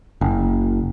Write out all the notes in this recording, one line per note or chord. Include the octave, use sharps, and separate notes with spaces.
F#1